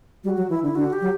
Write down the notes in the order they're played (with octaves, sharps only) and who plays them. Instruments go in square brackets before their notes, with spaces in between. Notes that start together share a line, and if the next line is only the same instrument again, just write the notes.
[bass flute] G3 [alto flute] F#4
[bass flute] F#3
[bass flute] E3 [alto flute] E4
[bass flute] D3 [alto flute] E4
[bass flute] D3 [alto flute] F#4
[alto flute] G4
[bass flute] F#3